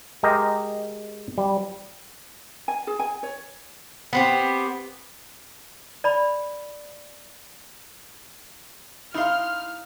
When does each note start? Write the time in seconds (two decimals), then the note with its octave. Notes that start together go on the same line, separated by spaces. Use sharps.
0.23 G#3 G4 A#4 D#5
1.38 G3
2.68 G#5
2.87 G#4
2.99 G#5
3.23 C#5
4.13 B3 C4 G4
6.04 D5 B5
9.15 D#4 E4 F5 C6 F6